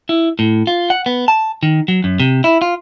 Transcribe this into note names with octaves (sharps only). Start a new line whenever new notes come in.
E4
A2
F4
F#5
B3
A5
D#3
F#3
F#2
C3
E4
F4